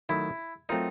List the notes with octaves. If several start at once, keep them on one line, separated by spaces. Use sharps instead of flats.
D#3 F#3 A3 E4
F#3 A3 C4 D#4 F4 A#4